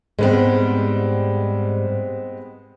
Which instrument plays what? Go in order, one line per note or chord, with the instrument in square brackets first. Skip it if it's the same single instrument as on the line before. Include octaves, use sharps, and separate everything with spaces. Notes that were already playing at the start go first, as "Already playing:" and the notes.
[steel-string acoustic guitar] G#2 G3 [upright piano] G#3 B3 C4